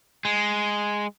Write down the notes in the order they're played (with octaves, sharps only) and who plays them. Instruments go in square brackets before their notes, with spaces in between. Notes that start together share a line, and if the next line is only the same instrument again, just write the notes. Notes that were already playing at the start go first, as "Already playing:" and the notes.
[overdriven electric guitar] G#3